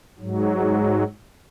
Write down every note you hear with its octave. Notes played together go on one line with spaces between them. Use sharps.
G#2 F#3